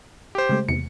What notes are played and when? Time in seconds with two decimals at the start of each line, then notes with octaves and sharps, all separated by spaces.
0.35 G4 C5
0.49 C#3 G#3 A3
0.69 E2 C3 C#7